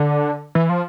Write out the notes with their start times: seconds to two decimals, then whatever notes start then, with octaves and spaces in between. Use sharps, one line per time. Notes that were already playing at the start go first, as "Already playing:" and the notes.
Already playing: D3
0.55 E3
0.69 F3